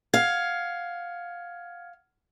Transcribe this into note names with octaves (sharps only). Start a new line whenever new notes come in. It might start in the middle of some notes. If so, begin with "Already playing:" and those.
F5 F#5 F6 G#6